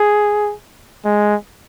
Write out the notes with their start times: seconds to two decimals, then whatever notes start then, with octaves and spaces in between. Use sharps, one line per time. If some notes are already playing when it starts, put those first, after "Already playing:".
Already playing: G#4
1.05 G#3